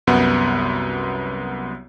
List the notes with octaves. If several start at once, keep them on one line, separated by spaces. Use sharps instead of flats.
C2 F#2 B3 F#5